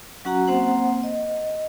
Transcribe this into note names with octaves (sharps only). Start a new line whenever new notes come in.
F#3 C#4 F#4 F#5 A#5
A#3 C4 C5 F#5
D#5